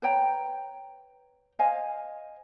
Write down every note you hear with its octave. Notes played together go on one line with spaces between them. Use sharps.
B4 C#5 G5 A#5
C5 D#5 F5 G#5